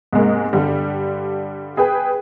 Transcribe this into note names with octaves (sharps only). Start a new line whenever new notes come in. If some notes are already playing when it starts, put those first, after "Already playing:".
G#2 C3 G#3 A#3
G2 D3 G3
G#4 B4 G5